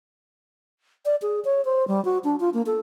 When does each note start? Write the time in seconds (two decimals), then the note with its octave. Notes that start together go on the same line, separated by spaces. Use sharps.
1.05 D5
1.22 G#4
1.45 C#5
1.65 C5
1.88 G3
2.05 F#4
2.24 D4
2.40 F4
2.54 A#3
2.66 A4